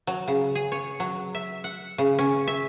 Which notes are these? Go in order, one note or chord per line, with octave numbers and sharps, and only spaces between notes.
F#3
C#3
G#4
C#5
F#3
E5
F#5
C#3
C#4
E5